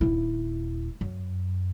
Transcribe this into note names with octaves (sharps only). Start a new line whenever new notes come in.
D#1 E4
F#2